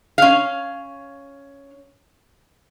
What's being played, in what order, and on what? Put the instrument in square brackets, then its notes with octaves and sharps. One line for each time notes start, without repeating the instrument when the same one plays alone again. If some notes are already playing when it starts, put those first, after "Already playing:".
[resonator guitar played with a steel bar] C#4 F5